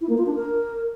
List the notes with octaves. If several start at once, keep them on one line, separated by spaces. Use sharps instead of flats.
E4
A#3
F4
D4
A#4